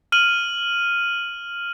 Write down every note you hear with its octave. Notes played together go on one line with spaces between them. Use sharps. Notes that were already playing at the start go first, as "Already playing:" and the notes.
F6 D#7 F#7